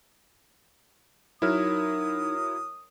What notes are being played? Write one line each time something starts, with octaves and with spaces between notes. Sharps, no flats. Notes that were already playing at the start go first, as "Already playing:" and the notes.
F#3 D#4 E4 A#4 C#5 D#6 F6